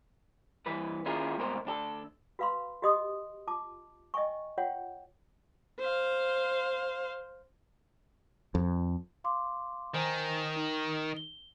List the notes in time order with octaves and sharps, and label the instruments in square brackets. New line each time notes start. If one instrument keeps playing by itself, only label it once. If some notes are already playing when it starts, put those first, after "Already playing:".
[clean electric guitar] G2 E3 B4 B5
D#2 C#4 E4 F4 G#4 A#4
C2 G#2 B2 A#4 C5
D2 D4 G4 A4
[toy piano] F#4 B4 F5 B5 C6
F#4 G4 D#5 C6 D#6
F4 A5 D6
D#5 E5 G5 G#5 C#6
F4 C#5 F#5 G5
[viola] C5 F5
[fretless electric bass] F2
[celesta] F5 C6 D6
[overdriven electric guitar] D#3 [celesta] C5 G#5 A#5
[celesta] D#4
G7